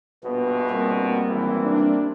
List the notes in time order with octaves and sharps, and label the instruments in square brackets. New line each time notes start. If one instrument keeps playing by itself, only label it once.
[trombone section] A#1 G2 B2 [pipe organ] B3
[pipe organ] G3 A#3 C4
[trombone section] G#1 E3
[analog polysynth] D4